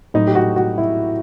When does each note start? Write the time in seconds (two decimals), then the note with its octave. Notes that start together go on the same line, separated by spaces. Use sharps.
0.14 A2 F#3 D#4
0.27 G4
0.35 F#4
0.56 F#4
0.78 E4